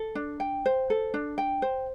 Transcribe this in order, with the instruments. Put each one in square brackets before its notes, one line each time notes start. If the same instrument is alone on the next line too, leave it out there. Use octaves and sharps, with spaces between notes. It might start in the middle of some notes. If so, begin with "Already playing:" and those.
Already playing: [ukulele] A4
D4
G5
C5
A4
D4
G5
C5